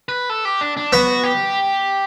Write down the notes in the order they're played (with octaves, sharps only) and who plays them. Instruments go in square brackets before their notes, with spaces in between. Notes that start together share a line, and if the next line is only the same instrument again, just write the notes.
[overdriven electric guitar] B4
A4
G4
D4
D4
[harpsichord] B3 [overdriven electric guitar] F#4
[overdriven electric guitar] G4